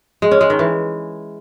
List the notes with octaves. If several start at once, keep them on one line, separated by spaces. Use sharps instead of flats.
G#3
C#4
G#3
D#3
E3